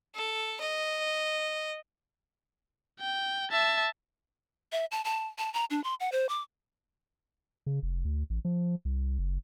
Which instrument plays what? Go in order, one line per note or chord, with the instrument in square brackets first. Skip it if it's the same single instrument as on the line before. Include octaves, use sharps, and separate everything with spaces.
[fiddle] A4
D#5
[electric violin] G5
E5 A5
[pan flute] E5
A5
A5
A5
A#5
D4
C6
F#5
C5
D6
[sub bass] C#3
F1
D2
A1
F3
C2
F#1